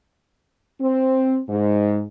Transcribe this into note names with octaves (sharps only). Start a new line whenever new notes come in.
C4
G#2